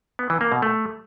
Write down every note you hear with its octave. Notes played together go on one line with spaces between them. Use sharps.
B3
E3
A#3
B2
A3